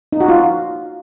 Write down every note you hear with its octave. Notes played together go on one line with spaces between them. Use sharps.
D#4
F#4
F4